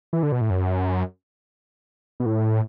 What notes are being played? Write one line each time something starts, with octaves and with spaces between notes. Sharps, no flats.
E3
D3
B2
A2
F#2
B2
A2